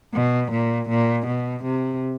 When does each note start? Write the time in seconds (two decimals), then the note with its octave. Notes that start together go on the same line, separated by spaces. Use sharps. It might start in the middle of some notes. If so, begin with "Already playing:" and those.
0.14 B2
0.52 A#2
0.90 A#2
1.27 B2
1.65 C3